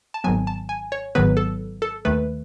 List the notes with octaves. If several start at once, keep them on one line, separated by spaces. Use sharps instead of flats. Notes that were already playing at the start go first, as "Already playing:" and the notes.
A5
G#1 G#2 D#3 F#3 B3 G#5
A5
G#5
C#5
G#1 G#2 D#3 F#3 B3 B4
A4
A4
D#2 D#3 A3 B4